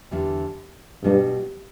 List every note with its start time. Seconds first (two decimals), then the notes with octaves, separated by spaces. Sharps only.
0.11 E2 D3 G3
1.04 G2 B2 G3 B3